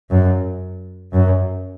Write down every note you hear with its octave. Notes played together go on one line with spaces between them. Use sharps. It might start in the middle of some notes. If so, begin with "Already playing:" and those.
F#2
F#2